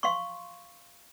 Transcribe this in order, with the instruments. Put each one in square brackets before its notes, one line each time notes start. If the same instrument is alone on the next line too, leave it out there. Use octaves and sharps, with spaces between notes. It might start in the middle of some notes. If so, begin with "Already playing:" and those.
[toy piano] F5 C6 C#6